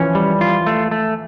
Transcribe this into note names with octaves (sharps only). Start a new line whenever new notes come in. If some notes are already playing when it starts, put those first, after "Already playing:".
Already playing: E3 F3 C#4
G3
F4
A3
A3